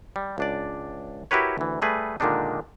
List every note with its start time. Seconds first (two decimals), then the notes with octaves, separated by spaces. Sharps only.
0.16 G3
0.38 C#2 D4 D5
1.31 E4 F#4 G4 A#4 B4 C#5
1.58 D2 E3
1.82 G3 A3 G#4 B4
2.20 A#2 D3 D#3 G#3 D4 D#4